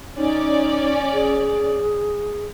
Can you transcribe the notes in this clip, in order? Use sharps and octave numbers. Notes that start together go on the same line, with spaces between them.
C#4 D#4 D5
G#4